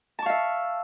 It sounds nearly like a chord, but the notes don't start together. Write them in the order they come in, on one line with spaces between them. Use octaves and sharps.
A5 C#6 F5 E5